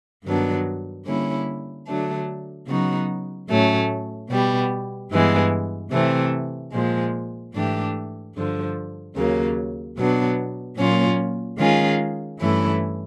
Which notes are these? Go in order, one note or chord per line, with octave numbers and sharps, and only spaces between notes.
G2 D#3 F#3 B3 D4
D3 G3 A#3 C#4 E4
D3 F#3 A3 D4
C#3 F#3 B3 D#4 F#4
A2 F#3 A3 C#4
B2 G3 B3
G2 E3 G#3 B3
C3 E3 A3 C4
A#2 F3 G#3
G#2 E3 A3 D4 G4
G2 D3 F3
D#2 C#3 F#3 A#3
B2 F#3 B3 D4
A#2 F#3 A#3 C#4 F4
D#3 G#3 C#4 F4 G#4
G2 E3 A3 C#4 E4